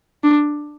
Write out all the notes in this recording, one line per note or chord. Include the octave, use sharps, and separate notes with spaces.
D4